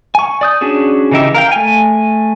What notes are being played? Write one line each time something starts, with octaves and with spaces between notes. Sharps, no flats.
G#5 C#6
D5 D#6 G6
C#4 D4 F#4 G#4
C#3 E3 D#4 G4 E5
A#4 F5 G5
A3 G#5